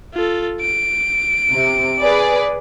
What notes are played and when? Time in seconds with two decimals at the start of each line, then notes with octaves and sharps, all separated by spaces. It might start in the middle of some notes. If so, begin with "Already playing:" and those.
0.13 F4 A4
0.61 D7
1.53 C3
2.02 G#4 B4 D5